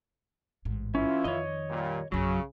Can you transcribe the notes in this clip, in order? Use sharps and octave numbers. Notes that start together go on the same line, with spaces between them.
A1 G#2
E3 C#4 E4 F4
F2 D#3 C#5 D#5
A#2 G3
A#1 F#2 C#3 F#3